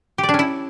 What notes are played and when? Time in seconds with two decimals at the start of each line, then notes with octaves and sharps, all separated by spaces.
0.18 G4
0.24 D5
0.29 D4
0.34 C#4
0.39 E4